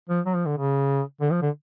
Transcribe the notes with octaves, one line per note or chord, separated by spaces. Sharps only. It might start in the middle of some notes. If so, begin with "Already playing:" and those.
F3
F#3
F3
D3
C#3
D3
F3
D3